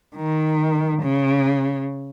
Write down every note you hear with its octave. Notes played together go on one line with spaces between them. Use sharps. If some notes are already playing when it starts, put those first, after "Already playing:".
D#3
C#3